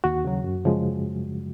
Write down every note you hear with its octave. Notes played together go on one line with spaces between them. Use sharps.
D#2 F#4
C#3 F#3
F#2
C#3 F3 G#3